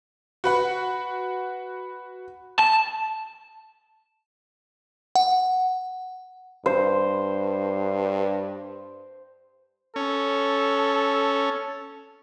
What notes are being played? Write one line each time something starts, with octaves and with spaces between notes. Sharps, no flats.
F#4 B4 F#5
A5
F#5
G2 C5
C#4 A4